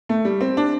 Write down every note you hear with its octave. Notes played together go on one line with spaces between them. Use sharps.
A3
G3
C4
D4